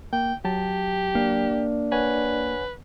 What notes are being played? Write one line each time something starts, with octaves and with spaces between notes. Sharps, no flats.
A#3 G5
F#3 G4 A5
A#3 D4
B4 C#5 F#5 G#5